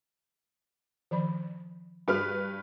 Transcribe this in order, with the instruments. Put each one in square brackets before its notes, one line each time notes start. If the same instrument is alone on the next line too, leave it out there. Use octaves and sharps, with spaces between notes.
[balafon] D#3 F3 B5
[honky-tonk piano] G2 B4 F6 [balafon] D4 F#4 G#4